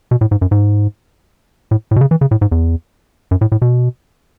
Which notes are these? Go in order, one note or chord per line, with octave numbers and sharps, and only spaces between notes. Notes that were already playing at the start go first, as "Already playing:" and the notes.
B2
A2
G#2
F#2
G#2
A2
A2
B2
C#3
E3
C#3
A2
G#2
E2
F#2
A2
A2
B2